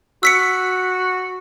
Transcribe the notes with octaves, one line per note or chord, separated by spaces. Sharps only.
F#4 E6 B6 C#7